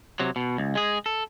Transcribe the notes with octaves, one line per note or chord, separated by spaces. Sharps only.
C3 F#3
B2
C#2
G#3 G#4
A4